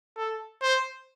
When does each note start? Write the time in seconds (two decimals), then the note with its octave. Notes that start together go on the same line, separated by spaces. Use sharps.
0.16 A4
0.62 C5